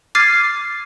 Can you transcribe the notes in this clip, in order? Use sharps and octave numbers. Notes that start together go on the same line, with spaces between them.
D6 F6 G#6 A6 C7 D#7